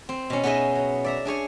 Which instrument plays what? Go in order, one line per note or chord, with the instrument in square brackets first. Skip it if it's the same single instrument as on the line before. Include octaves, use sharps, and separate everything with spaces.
[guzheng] C4
B2 C#4
B3 D#4 G#4 D#5 E5
F#3
D5 E5 A#5
D4 G#4 C#5 G#5